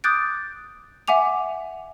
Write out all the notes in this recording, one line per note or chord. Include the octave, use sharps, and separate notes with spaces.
D6 D#6 F#6 G6 A6 D7
E5 F#5 G#5 D6 F7